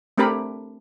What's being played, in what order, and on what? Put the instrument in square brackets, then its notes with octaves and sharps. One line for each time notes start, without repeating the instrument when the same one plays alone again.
[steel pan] A3 C4 D4 G4 A#4 B5